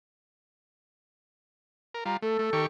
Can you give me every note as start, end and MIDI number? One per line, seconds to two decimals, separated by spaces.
1.94 2.04 70
2.06 2.17 55
2.06 2.17 65
2.06 2.16 82
2.22 2.37 57
2.22 2.64 69
2.39 2.50 57
2.53 2.66 51
2.53 2.66 67
2.53 2.66 85